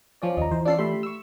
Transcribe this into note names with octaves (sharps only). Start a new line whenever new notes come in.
F3 C#4 D5
D#2 D#5 A#5
E3 C5
C#4 D4 F4 A4 D5 C7
A3 G4 E5 B5 C6
C#6 E6